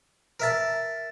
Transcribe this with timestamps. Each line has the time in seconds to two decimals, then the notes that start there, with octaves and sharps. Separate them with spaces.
0.40 A#4 E5 A5